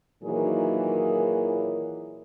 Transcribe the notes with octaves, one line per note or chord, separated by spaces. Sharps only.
A#2 D#3 E3 F#3 A#3 G#4